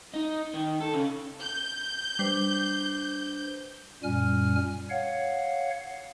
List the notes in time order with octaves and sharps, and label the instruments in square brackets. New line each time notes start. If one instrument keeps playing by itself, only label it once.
[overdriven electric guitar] D#4
D#3
A4
C#3
[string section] G6
[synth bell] G3 [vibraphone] D4 B4 C5
[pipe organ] F#2 A#2 G3 G#5 F6
C#5 F5 F#5